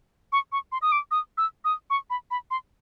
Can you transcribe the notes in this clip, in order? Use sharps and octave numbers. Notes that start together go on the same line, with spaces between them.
C#6
C#6
C6
D#6
D6
D#6
E6
D#6
C#6
B5
B5
C6